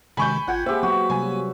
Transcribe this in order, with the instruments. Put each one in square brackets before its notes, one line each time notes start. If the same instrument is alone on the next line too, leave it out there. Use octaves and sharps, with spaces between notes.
[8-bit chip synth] C3 D#3 G#3 [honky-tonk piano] G#5 C#6 G6 [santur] B5
[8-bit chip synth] G#1 F4 G#6 [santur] F#5 G5
[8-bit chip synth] A#3 [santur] G4 E5 [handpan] G#4 C5
[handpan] F#3 B3 [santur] F#4
[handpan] C3 F#3 G3 [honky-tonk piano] G#5